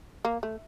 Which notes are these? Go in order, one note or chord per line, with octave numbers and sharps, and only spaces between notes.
A#3
A3